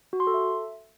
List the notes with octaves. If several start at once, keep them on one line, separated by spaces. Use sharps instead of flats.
F#4
C6
A4
E5